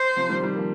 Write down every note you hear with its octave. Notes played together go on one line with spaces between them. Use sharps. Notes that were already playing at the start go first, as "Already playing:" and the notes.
Already playing: C5
C3 F3
D#3 G3
D#3 G3
F3 A#3